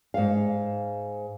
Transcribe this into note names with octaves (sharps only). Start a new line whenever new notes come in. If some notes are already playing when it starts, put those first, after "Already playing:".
G#2 F5